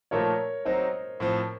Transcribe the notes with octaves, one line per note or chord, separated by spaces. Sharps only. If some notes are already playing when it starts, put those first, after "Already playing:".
A#2 F3 A3 D#4 A4 A#4 C#5
F#3 C4 D#4 C5 D#5
A2 F3 C4